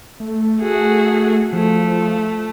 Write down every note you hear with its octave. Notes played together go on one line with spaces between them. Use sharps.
A3
F#4 G#4
F3 A3